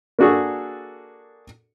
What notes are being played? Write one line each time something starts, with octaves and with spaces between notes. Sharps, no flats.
A#3 D4 F#4 G#4 A4